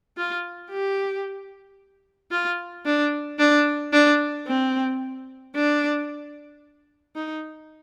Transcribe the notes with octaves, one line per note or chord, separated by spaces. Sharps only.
F4
G4
F4
D4
D4
D4
C4
D4
D#4